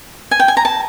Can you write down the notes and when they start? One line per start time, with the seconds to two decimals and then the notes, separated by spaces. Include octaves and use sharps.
0.31 G#5
0.40 G5
0.48 G#5
0.57 A#5
0.65 A5